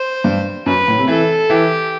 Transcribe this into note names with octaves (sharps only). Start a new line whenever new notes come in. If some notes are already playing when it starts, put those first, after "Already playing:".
Already playing: C5
G2
F#2 B4
A2
C3
E3 A4
E3 G4